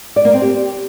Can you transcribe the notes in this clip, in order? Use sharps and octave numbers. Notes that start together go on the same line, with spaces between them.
D5
A#3
C4
G4